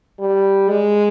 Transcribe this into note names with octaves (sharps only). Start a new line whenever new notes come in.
G3
G#3